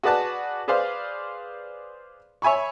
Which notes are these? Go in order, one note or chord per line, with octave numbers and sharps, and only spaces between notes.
F#4 G#4 B4 D5 A5 F#6
G#4 B4 C5 D5 F5
C#5 E5 G#5 B5 C#6